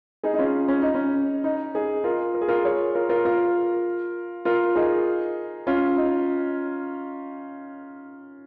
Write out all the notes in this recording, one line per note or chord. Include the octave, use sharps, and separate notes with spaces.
D#4 G#4
D#4
C#4 F4
C#4
D#4
C#4
D#4
D#4 G#4
F4 A#4
A#4
G#4
F4 A#4
G#4 C#5
F4 A#4
F4 A#4
F4 A#4
F4 A#4
D#4 G#4
C#4 F4
D#4